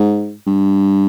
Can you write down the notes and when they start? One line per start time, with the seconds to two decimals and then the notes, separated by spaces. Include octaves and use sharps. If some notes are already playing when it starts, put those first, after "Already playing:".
Already playing: G#2
0.47 G2